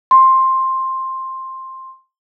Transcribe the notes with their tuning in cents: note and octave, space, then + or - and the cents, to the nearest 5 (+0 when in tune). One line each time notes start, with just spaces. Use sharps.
C6 +10